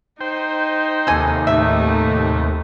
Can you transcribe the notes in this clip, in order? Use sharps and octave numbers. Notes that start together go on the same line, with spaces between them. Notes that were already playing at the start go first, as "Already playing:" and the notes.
D#4 C5 G5
D#2 C3 A4 G#5
A2 A3 D#4 E5